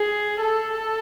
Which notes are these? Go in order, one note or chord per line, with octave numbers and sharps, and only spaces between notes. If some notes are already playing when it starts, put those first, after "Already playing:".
Already playing: G#4
A4